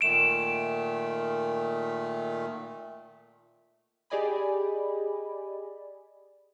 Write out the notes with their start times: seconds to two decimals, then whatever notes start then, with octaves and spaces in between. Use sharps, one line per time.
0.01 A#2 D#3 A3 D7 E7
4.10 G4 G#4 D5 D#5 G#5 B5